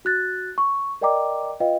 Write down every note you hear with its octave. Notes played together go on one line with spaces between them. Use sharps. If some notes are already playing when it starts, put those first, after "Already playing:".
F#4 F#6 A6
C#6
A#4 D5 D#5 G5 A#5 D6
F4 B4 D#5 F5 G5